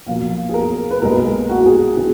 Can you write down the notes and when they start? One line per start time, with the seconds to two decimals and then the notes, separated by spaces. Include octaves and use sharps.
0.06 B1 A#2 F3 A#3 F5
0.49 G#4
0.54 A#4
0.91 B4
1.02 B1 A#2 G#3 A#4
1.49 F#4
1.66 G#4
1.97 D3 G#4